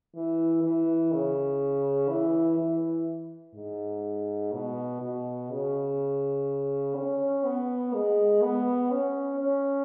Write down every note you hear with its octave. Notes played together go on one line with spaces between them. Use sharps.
E3
E3
C#3
E3
E3
G#2
B2
B2
C#3
C#4
B3
G#3
B3
C#4
C#4